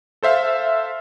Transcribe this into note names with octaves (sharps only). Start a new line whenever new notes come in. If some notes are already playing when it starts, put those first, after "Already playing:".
A4 C5 E5 F5